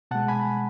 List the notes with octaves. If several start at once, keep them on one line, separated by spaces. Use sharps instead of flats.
B2 G#3 F#5 A5
G#5 B5